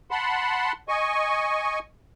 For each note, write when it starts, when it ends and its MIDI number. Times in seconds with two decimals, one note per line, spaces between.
0.11 0.72 78
0.11 0.72 81
0.11 0.72 83
0.11 0.72 84
0.88 1.79 75
0.88 1.79 80
0.88 1.79 85